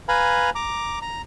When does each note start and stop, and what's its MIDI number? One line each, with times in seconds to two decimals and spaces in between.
0.08 0.50 71
0.08 0.50 77
0.08 0.50 80
0.08 0.50 82
0.08 0.50 83
0.55 0.99 82
0.55 0.99 86
1.02 1.22 82